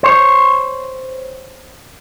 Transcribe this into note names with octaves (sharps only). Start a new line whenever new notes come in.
C5 C#5